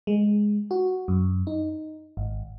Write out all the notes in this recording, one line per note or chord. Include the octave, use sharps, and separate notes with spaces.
G#3
F#4
F#2
D#4
G#1